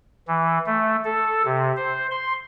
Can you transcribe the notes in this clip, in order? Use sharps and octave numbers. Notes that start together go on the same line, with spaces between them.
E3
A3
A4
C3
C5
C6